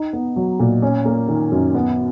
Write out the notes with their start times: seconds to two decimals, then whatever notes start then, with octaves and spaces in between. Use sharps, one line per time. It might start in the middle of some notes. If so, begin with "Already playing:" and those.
Already playing: D#4
0.13 B3
0.36 F#3
0.60 A#2
0.82 C#4
1.05 A#3
1.28 D#3
1.52 F#2
1.74 B3